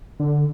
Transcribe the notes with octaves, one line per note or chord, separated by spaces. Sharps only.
D3